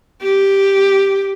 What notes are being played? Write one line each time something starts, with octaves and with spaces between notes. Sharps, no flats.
G4